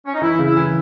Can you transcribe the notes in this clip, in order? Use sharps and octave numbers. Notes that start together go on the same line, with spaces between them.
C#4
D#4
E3 E4
C#3
E4
E3